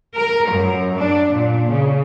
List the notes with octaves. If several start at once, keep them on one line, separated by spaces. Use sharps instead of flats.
A#4
F#2
D4
A#2
C#3